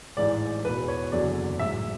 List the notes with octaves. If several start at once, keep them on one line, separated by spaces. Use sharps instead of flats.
A1 G#2 E3 D5
E1 E2 B2 B4
C#5
F#1 E2 D3 F#3 D5
A1 G#2 F#3 E5